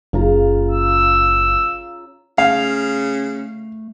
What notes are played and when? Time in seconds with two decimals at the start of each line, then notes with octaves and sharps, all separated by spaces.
0.13 F#1 C#3 F4 A#5
0.72 E6
2.38 C#3 A3 F5